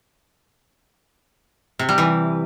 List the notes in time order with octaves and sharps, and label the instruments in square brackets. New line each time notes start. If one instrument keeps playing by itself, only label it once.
[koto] C3
G3
E3